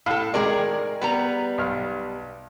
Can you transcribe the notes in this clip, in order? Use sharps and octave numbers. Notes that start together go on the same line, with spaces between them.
A2 A4 F5 B5
D#3 G#3 G#4 A#4 D5
G3 B3 B4 A#5
B1 F6